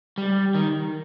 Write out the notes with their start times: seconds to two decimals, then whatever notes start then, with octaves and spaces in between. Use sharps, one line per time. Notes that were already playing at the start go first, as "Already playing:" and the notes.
0.18 G3
0.55 D#3